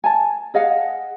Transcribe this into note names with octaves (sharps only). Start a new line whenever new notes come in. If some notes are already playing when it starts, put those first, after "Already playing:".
G#5 A5
G#4 D#5 F5 F#5